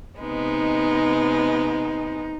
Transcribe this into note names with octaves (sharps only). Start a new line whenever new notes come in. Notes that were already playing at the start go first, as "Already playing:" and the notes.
C3 G#3 B3 D#4